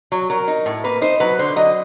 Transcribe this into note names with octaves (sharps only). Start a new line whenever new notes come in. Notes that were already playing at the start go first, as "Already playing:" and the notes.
F#3
F#3 A#4
D#4
A2
A#3 B4
D#4 C5
F#3 B4
D3 C5
F#3 D#5